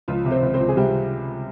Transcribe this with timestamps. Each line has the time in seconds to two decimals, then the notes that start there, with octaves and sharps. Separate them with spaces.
0.08 C#2 F3 F4
0.25 C3
0.31 C4 C5
0.42 C#2
0.54 C4 C5
0.60 C#2
0.69 G#4
0.76 C3 G3 G4